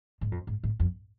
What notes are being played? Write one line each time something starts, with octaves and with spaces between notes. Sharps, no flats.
G#2
F2
G#2
G#2
F2